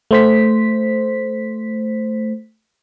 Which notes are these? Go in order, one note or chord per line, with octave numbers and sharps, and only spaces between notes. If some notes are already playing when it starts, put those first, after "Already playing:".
A3 C5 B6